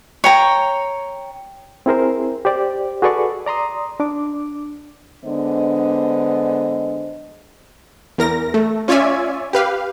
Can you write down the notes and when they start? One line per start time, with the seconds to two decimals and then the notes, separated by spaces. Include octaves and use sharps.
0.24 C#5 G5 A#5
1.86 C4 E4 G#4 A#4 C5
2.45 G4 C5 D5
3.02 F#4 G#4 A4 B4 D5 C#6
3.46 D5 A#5 C6 D#6
4.00 D4 D6
5.24 D3 G#3 B3 D4 C5 D#5
8.18 E2 A#4 A#6
8.54 A3
8.88 C#4 F4 C#5 D5 E5 G#5
9.53 G4 B4 F5